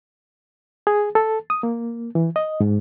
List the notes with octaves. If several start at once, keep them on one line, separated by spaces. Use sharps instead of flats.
G#4
A4
D#6
A#3
E3
D#5
G#2